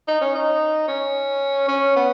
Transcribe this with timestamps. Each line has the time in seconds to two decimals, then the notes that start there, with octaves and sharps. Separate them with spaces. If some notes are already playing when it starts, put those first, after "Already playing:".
0.08 D#4
0.21 C#4
0.35 D#4
0.88 C#4
1.68 C#4
1.96 B3